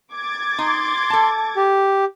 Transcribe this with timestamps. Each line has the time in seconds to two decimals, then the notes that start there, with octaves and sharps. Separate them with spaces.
0.13 D6 G#6 A6
0.58 D#4 C6
1.10 A4 A5
1.56 G4